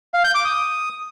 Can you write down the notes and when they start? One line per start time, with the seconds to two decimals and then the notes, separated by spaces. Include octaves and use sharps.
0.14 F5
0.24 G6
0.35 D6
0.45 D#6